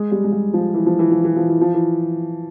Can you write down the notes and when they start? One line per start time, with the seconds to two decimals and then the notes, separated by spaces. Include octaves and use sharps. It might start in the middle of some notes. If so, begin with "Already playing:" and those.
Already playing: G#3
0.12 G3
0.24 G#3
0.32 G3
0.54 F3
0.74 E3
0.86 F3
0.99 E3
1.11 F3
1.24 E3
1.36 F3
1.49 E3
1.61 F3
1.74 E3